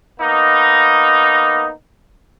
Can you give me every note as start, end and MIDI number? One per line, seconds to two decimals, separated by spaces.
0.20 1.71 58
0.20 1.71 59
0.20 1.71 63